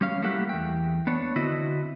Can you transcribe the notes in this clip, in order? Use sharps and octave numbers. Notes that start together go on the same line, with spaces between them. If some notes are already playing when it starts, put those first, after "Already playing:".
G3 C#4 F5
G3 A3 A#3 E4 G4 F#5
E2 G5
B3 D4 C#5
D3 C4 E4 F#4 D#5